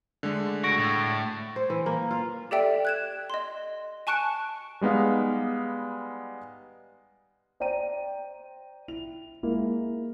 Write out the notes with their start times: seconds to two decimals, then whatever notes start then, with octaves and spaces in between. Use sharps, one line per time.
0.23 D3 G#3 A3
0.64 C#2 F#4 C#6 A#6 D7
0.78 A2
1.56 C5
1.70 E3
1.86 A#3
2.11 F4
2.51 G4 A4 D5 E5 G5 D7
2.85 F#6 G#6 E7
3.30 D#5 C6
4.07 G#5 A5 C#6 F#6 C#7 D7
4.81 G3 G#3 B3 D#4 F5
7.60 C5 D5 G5 A#5 D#7
8.88 E4 F7
9.43 G#3 A#3 E4